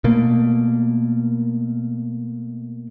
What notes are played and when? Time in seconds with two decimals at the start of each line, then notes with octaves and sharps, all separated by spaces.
0.04 B2 A3 A#3